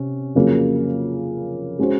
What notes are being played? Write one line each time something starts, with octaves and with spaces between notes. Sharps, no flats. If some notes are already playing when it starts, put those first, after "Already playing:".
Already playing: C3 C#4
F2 C#3 F#3 A#3
G#3 C#4 F#4 C5